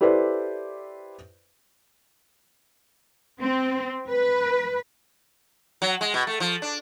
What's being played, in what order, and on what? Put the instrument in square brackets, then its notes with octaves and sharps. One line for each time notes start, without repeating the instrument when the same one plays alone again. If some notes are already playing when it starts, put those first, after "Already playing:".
[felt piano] E4 G4 A4 B4 C5 D5
[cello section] C4
B4
[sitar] F#3
G#3
B2
A3
F3
D4